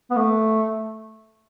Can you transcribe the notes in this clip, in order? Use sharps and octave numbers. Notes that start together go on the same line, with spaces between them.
B3
A3